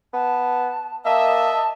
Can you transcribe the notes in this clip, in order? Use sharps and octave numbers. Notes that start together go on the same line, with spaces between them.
B3 A5
A#3 D#5 E5 A5